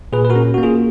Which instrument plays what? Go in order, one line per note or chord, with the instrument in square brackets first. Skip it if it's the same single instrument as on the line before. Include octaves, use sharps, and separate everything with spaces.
[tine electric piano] A#2 G#4 B4
B4
F#4 A#4
C#4
A#3 F#4
F4 G#4